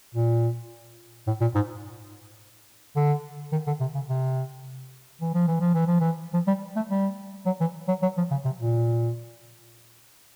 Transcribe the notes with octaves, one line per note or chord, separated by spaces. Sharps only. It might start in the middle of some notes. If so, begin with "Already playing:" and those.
A#2
A2
A#2
G#2
D3
D#3
D3
C3
C#3
C3
E3
F3
E3
F3
E3
F3
E3
F3
G3
A3
G3
F#3
E3
F#3
F#3
F3
C#3
C3
A#2